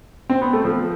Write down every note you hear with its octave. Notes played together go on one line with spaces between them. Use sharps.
C4
B3
A3
F3